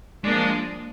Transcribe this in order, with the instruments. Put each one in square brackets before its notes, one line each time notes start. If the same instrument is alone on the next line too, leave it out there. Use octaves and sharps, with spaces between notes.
[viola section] F3 A#3 D4 [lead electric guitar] G#3